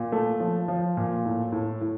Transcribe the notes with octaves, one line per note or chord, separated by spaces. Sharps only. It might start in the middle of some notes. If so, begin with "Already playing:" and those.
Already playing: A#2
A3
F3
F3
A#2
A2
A2
A2